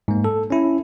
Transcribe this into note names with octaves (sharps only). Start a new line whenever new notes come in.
G#2 A#3
A4
C#4 E4